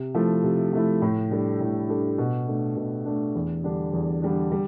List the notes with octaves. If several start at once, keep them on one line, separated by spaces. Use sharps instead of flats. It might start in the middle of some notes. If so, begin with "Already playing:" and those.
Already playing: C3
F3 A3 E4
C3
F3 A3 E4
A2
G3 D4 A4
A2
G3 D4 A4
B2
A3 D4
B2
A3 D4
E2
D3 G3 D4
E2
D3 G3 D4
G3